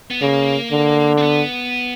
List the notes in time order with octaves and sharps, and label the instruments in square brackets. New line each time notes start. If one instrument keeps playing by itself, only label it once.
[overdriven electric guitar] B3
[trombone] C#3 [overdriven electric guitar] A#3
[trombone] D3
[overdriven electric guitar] C4
B3